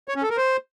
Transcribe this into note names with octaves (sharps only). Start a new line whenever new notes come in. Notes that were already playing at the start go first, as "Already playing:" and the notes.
C#5
C#4
A4
A#4
C5